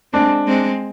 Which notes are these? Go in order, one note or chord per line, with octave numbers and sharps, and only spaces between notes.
G#3 C4 D4
G#3 C4